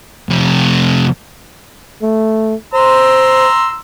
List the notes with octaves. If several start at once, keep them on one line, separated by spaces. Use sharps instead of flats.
F2 C3
A3
C5 A#5 C6 E6